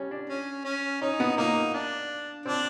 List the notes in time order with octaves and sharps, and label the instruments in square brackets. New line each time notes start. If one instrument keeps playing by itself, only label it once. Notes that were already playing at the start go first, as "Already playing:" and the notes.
Already playing: [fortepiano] G3 C#4
D4
[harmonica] C#4
C#4
[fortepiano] C#4 [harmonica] D#4
[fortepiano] B3
[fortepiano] A#3 [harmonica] D#4
[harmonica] D4
[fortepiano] C4 [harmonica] D4